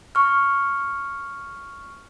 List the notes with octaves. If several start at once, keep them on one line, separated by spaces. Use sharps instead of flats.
C#6 F6